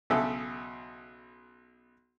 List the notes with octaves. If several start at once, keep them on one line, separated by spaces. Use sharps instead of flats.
B1 C#3 A4 E5